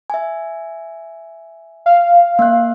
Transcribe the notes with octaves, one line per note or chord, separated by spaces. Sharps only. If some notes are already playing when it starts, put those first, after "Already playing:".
E5 G#5
F5
A#3 F#6